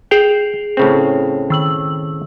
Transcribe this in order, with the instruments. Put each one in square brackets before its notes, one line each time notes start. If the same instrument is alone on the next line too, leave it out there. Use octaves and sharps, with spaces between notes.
[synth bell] G#4 C7 F7 [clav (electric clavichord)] G5
[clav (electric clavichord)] A2 C#3 C4
[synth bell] D#3 E6 F#7